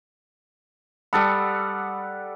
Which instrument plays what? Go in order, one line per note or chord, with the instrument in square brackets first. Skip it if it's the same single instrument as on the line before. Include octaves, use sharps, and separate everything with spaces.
[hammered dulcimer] G3 A4 F#5 [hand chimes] B5 D#6 E6